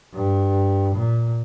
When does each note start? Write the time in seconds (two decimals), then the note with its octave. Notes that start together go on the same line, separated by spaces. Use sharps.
0.14 G2
0.94 A#2